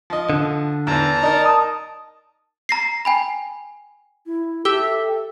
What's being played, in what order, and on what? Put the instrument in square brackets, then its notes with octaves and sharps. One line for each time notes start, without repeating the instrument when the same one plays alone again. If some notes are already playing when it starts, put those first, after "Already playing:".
[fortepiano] F3 D#5
[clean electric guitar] D3
[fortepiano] E2 E3 [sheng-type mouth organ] A5 A#5
[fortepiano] D#4 A#4 [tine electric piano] D5
[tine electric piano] A5 D#6
[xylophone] A#5 A#6 C7
G5 G#5 B5
[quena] E4
[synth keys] G4 E5 [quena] A4 [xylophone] G7